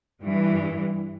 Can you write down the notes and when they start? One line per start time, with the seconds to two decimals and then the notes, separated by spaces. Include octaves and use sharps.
0.23 G2 E3